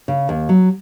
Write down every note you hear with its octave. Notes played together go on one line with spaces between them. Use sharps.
C#3
D#2
F#3